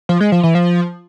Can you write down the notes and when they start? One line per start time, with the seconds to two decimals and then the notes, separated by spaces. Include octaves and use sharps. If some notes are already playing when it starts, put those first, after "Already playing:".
0.09 F3
0.20 G#3
0.32 F3
0.43 E3
0.55 F3